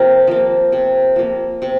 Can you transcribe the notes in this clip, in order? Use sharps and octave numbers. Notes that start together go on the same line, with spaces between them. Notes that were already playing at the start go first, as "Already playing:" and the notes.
Already playing: C3 F3 A#3 A#4
F3 A#3
C3
F3 A#3
C3